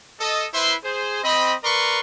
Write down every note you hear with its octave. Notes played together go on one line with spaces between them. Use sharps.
A4 D#5
E4 B4 C5 E5 C6
G#4 C5
C4 D#5 B5
A#4 B4 D5 A#5 C6 C#6